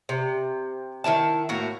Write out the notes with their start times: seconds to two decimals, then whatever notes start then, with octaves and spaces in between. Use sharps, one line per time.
0.09 C3
1.04 D#3 C4 E4 A5
1.49 A2 A#3 F#4 A#4